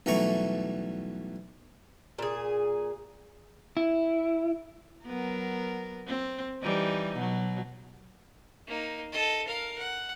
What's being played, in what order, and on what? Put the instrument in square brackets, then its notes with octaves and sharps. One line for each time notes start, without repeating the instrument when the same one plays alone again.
[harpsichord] B1 E3 G3 A3 A#5 C#6
[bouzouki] A#2 G#4
[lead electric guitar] E4
[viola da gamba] F#3 B3 A#4
C4
E3 G3 D#4
B2 F#3
[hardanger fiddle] A#3 D#4
A4 D#5
A#4 F5
F#5